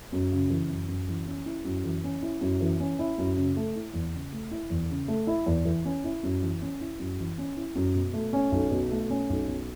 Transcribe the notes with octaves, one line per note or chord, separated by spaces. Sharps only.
F#2
C#3
E3
F#2
F#2
E3
C#4
E4
F#2
E3
C#4
E4
F#2
E3
C#4
E4
F#2
C#3
A3
E4
E2
C#3
A3
E4
E2
C#3
A3
E4
E2
E3
C#4
E4
F#2
E3
C#4
E4
F#2
E3
C#4
E4
F#2
B2
A3
C#4
B1
B2
A3
C#4
B1
B2